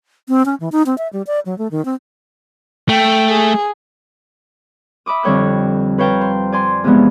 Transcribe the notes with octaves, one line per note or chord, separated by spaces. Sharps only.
C4
C#4
E3
D#4
C4
E5
G3
D5
F#3
A3
D#3
C4
A3 G5
G#4
E5 B5 D6 D#6
F2 D3 G3 C#5 G5 F#6
B4 C#5 F5 G5 A5 A#5
C5
D5 G#5 C6
E2 C3 F3 G#3 B3